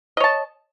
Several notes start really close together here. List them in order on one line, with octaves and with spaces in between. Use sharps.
D#5 C#5 A5